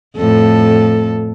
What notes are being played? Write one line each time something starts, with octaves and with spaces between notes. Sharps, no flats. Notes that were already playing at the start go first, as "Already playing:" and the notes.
F2 A2 A4